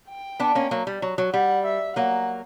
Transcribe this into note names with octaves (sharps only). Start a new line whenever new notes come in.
G5
B3 D4
A#3 C#4
F#3 A#3
G3
F#3
F#3
G3 F#5
E5
F#3 A#3 F#5